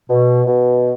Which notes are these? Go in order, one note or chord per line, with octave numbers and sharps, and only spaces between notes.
B2
B2